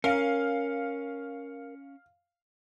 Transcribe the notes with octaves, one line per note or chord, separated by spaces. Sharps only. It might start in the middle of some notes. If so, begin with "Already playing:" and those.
C#4 A#4 F5